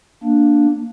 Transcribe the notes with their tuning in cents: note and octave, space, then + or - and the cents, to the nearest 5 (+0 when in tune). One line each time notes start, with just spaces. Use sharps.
A#3 +0 D4 +0